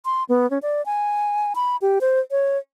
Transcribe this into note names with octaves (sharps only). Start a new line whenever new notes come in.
C6
B3
C#4
D5
G#5
B5
G4
C5
C#5